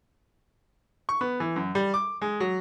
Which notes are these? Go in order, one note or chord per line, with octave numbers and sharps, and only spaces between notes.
C#6
B3
E3
F#2
G3
D6
G#3
F#3